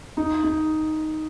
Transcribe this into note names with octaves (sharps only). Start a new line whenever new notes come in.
D#4
D#4